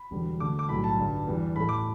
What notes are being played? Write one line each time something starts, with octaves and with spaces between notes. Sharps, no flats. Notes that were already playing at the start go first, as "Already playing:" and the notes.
Already playing: B5
E1 E2 D3 G3
D2 D3 A3 D6
D6
B1 A2 G3 B5
A5
G1 G2 G3
E2 E3 G3
A1 A2 A3 B5
D6